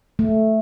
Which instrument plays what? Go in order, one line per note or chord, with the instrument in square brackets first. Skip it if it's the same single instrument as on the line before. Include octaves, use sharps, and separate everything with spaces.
[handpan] A3